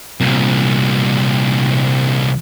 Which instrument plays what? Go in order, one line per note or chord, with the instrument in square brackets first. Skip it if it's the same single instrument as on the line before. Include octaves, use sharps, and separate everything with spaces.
[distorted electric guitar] C2 A#2